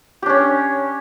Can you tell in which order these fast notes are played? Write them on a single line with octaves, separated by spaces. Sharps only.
G4 D4 C#4